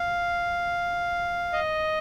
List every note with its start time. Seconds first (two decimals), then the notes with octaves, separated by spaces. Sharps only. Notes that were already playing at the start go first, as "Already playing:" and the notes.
Already playing: F5
1.53 D#5